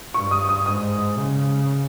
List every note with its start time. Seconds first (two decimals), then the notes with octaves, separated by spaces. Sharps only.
0.14 G2 C#6
0.31 D#6
0.49 D#6
0.66 G#2 D#6
1.18 C#3